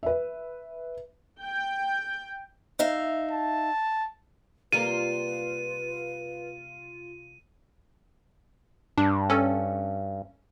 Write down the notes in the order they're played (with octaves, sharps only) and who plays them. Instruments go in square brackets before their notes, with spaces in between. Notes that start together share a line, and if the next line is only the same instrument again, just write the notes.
[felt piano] B4 E5
[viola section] G5
[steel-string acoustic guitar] D#4 E5 F5
[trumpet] A5
[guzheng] C3 G3 A#3 [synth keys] F4 [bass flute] B4 [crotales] D#7
[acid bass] G2 [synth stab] D4
[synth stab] C#4 A4